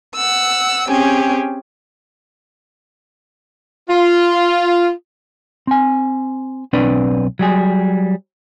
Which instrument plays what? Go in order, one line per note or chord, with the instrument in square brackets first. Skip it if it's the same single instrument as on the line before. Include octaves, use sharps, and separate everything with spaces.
[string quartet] F#5 E6
C4 C#4 G4 G#4
[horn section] F4
[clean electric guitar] C4 G#5
B1 C4 D4 B4 D5
F#3 G3 G#4